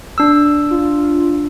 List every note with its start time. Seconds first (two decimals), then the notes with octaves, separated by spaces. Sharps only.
0.18 D4 E6
0.70 F4